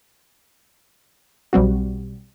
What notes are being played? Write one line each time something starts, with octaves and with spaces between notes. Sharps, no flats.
B1 G3 C4 F#4